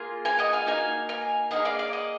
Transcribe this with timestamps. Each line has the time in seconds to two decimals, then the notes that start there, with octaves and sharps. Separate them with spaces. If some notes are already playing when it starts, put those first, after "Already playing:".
Already playing: A#3 F4 G#4
0.25 F5 G#5
0.39 D#5 F#5
0.53 F5 G#5
0.66 A#3 D#4 F#4 F5 G#5
1.09 F5 G#5
1.51 A#3 D#4 D#5 F#5
1.56 G#4
1.65 D5 F5
1.79 D5 F5
1.93 D#5 F#5